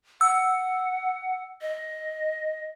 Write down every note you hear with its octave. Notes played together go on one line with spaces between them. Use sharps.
F#5 E6
D#5